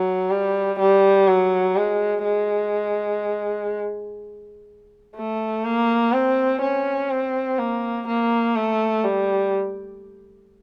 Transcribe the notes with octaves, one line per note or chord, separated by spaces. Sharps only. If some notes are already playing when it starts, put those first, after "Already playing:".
Already playing: F#3
G3
G3
F#3
G#3
G#3
A3
A#3
C4
C#4
C4
A#3
A#3
A3
G3